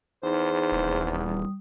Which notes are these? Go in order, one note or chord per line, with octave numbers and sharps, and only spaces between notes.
E2 D#4 G#4 C5
D#1
G3 D#6